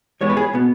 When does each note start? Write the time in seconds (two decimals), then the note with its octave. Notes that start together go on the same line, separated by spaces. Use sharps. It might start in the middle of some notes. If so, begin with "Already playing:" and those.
0.21 G#2 E3 G#3 B3 C#5
0.30 B4
0.37 G#4
0.53 B2 B3